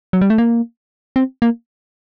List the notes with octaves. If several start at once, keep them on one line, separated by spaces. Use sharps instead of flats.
F#3
G3
A3
A#3
C4
A#3